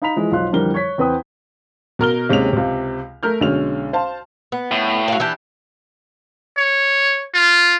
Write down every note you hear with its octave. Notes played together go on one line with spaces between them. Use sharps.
D#4 F5 A#5 B5 B6 F7
E3 F3 G#3
B1 F3 D#5 F5 C6 F#6
F2 D3 E3 G3 A#4 G7
C#5 C#6 G#6 B6
E2 C4 B4 G5 D#6
B2 A#4 F6 G7
D#2 C3 G#3 C#4 F7
C#2 C3
A3 A#4 F6 G6
B1 D3 G#3 C#4 F7
C5 F5 A5
B3
A2
F#4 F5
E3 D4 G4
C#5
F4